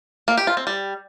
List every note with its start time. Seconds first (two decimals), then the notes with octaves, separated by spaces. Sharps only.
0.28 A#3
0.38 G4
0.47 F4
0.57 C4
0.67 G3